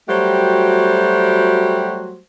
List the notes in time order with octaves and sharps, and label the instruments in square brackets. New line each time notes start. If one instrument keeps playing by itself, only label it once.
[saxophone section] F#3 G3 A3 F#4 G4 C5